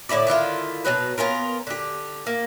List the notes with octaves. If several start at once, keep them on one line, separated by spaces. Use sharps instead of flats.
A2 D3 E4 D5
D3 D#3 E4 F4
B2 F3 F#3 B4
B3 C#4 F4 A#4
D3 G4
A#3